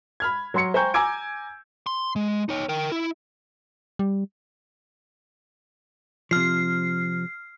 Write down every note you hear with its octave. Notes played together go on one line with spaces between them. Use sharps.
B5 F6 G#6
F#3 C6 C#7
C5 G5 G#5 A#5 C#6 G6
G#5 A#5 D6 E6 G#6 D7
C6
G#3
D#4 C#5
A#4 G5
E4
G3
C3 F3 F6 C7